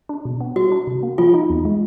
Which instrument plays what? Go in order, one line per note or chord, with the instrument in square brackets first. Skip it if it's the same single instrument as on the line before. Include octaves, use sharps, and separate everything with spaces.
[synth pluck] D4
B2
B3
[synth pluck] G3 [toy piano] F#4
[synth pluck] D4
C3
A#3
[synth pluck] F3 [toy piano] F4
[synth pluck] D#4
E2
G#3